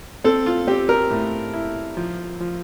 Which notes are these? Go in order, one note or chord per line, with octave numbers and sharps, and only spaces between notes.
C4 A4
F4
C4 G4
A#4
A2
E4
F3
F3